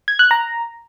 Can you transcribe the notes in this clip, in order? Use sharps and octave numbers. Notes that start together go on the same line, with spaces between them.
G#6
F#6
A#5